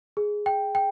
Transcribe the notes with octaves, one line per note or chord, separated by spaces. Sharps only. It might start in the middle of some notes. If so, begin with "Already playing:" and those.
G#4
G5
G5